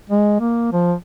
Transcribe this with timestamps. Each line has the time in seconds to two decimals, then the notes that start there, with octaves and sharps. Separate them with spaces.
0.10 G#3
0.40 A#3
0.72 F3